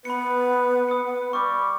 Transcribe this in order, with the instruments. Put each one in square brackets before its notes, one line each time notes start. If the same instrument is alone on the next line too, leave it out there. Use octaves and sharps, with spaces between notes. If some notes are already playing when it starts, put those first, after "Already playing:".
[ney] B3 [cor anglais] B4 [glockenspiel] B5 C#7
[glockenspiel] D#6 C#7
[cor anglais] G3 [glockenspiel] C#6 D6